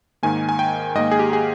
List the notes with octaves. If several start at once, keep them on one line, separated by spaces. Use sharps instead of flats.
G#2 D#3 A#3 G#5
G#5
G5
G#2 D#3 A#3 D#5
G#4
G4
G#4